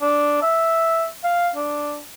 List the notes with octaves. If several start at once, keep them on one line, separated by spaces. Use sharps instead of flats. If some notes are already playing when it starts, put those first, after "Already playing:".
D4
E5
F5
D4